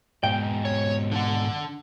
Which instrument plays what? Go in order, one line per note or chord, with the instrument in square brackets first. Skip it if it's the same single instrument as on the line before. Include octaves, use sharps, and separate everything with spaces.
[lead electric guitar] G#2 B2 [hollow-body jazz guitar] G5
[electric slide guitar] C#5
D3 D4 F#5